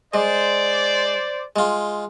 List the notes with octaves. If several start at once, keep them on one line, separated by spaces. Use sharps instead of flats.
G#3 C5 D5
G#3 F4